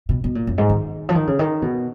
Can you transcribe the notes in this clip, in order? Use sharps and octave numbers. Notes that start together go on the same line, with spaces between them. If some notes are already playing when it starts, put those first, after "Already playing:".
B2
B2
A#2
F#2
G#2
D#3
F3
D#3
C#3
D#3
B2